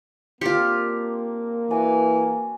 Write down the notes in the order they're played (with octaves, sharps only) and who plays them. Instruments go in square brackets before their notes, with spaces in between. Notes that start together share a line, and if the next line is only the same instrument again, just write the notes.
[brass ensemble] A#3 [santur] C4 D4 [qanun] F4 G4
[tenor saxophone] E3 [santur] F#4 D5 G#5